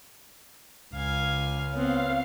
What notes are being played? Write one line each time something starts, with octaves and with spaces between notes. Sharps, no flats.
C#2 F5 G#5
B3 C4 C#5 F5